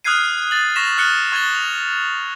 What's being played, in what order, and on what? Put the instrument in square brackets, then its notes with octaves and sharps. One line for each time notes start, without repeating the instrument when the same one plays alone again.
[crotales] D#6 F6 F#6 G#6 C7 D#7
A6 F#7
C#6 A#6 B6 E7 F7
F6 F#6 C#7 G7
C#6 G#6 A6 E7 G7
F7